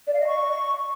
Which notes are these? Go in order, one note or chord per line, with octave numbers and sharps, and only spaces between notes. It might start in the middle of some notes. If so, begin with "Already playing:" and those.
D5
F5
D#5
C#6